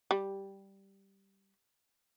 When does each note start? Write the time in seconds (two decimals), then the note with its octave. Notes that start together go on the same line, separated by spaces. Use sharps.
0.11 G3